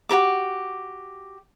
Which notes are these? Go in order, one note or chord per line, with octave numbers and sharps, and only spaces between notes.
F#4 G4 A#4 D6